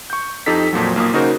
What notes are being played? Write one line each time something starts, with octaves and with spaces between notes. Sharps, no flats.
C#6 G6
F2 D#4 G4 A4 B6
F2 A#2 F3 F#3
B1 A#3 F4 D#6
C#3 D#4 F#4 A#4 C5